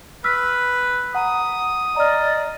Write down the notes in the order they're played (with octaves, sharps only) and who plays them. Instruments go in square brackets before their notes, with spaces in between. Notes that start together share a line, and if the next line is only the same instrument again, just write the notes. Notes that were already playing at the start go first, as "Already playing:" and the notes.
[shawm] B4 [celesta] E6 F6 B6
[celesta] F#5 A#5 [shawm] D#6
[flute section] D5 D#5 [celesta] A#5 F6